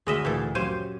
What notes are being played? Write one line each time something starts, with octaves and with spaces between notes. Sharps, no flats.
D2 G#3 D#5 E5
A#2 E3 A4
F#2 G4 C5 C#5 F5 D#7